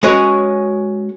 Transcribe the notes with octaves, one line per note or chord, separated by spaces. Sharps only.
G#3 C#4 F#4 G#4 B4 C#5